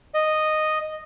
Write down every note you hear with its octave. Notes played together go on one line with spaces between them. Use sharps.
D#5